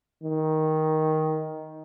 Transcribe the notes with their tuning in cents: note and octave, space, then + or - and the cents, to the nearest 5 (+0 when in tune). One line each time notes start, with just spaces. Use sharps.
D#3 +10